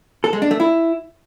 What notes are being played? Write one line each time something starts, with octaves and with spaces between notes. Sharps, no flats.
A4
G#3
D4
A3
E4